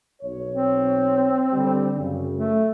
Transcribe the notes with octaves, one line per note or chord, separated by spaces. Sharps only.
B1 C#5
C4
D3 G3
F#2 C#3
A3